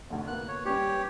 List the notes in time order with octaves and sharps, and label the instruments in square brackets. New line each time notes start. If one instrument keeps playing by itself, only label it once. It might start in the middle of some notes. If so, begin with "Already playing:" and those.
[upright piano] F1 D2
[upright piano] A#3 B3 [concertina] F#6
[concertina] C#5
[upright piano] G3 C#4 B4 [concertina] G4 C#5